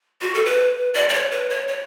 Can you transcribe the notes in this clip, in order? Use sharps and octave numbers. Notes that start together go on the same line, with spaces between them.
F#4
A4
B4
D5
D5
C#5
B4
C#5
C#5